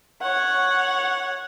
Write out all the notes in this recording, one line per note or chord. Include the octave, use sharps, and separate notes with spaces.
C#5 F#5